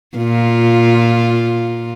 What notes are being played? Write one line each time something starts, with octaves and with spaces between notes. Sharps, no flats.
A#2 F4